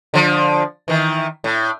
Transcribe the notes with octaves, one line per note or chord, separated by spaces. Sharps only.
D3 F3
D#3 E3
A2